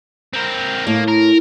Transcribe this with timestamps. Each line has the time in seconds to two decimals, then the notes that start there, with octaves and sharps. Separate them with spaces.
0.34 C4 A#4
0.87 A2 A#3
1.08 A#4